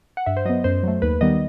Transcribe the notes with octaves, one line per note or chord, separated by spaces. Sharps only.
F#5
G2 E5
C5
F#3 B3 D#5
F#2 C5
F#3 A3
D#2 B4
D#3 G3 B3 D#5